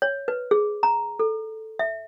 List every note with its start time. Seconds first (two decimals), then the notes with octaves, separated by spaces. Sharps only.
0.02 C#5
0.28 B4
0.51 G#4
0.83 A#5
1.19 A4
1.79 E5